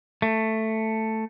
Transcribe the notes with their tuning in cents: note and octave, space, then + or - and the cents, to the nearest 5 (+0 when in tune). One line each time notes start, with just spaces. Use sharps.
A3 +5